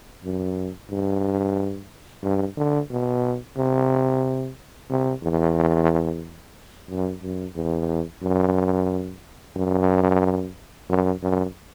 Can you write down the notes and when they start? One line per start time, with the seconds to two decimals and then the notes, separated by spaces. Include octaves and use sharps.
0.24 F#2
0.90 G2
2.23 G2
2.57 D3
2.90 B2
3.57 C3
4.90 C3
5.23 E2
6.89 F#2
7.22 F#2
7.56 E2
8.23 F#2
9.56 F#2
10.89 F#2
11.22 F#2